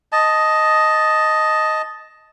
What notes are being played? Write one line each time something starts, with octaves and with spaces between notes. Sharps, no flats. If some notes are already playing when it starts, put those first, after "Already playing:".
D#5 A5